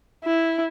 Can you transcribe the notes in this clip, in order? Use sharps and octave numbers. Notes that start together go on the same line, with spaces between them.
E4